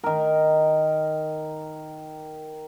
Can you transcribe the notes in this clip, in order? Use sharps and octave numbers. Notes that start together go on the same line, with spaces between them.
D#3 A#4